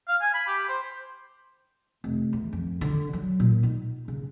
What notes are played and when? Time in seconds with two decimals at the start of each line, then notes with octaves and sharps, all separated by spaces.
0.08 F5
0.22 G#5
0.34 B5
0.47 G4
0.69 C5
2.04 F1
2.33 E2
2.53 F2
2.81 D3
3.13 F#3
3.40 A#2
3.63 D#4
4.08 C#3